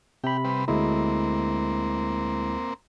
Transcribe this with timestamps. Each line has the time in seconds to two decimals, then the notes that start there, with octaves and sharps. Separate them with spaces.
0.24 C3 G4 B5
0.45 G3 C4 B4
0.68 D2 G#3 A#3 C4 E4